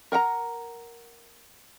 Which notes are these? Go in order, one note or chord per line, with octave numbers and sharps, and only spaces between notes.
A#4 F#5 G5 A#5